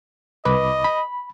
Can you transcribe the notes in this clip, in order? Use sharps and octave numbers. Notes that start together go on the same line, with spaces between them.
C2 B4 D#5 B5 D6
B5